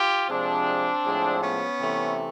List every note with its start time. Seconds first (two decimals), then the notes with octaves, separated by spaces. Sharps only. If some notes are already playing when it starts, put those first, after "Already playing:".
Already playing: F4 G4
0.29 C3 F3 G#3 C4 D4
1.05 A2 F3 G#3
1.42 B3 C#4
1.80 C3 E3 A3